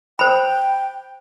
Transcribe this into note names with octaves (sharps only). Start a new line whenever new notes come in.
C5 G5 B5